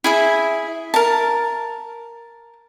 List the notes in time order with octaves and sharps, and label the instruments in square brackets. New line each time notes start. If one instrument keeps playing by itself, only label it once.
[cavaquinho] E4 G#4 E5
A#4 A5